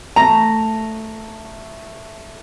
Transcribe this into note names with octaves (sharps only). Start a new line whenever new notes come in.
A3 A#5